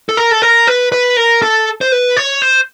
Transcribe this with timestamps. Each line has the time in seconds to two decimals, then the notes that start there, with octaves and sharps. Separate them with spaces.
0.09 A4
0.17 A#4
0.31 A4
0.42 A#4
0.67 B4
0.92 B4
1.17 A#4
1.42 A4
1.81 C5
1.92 B4
2.17 C#5
2.42 C5